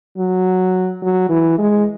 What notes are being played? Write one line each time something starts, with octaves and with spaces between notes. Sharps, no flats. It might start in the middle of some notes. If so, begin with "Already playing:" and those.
F#3
F#3
E3
G#3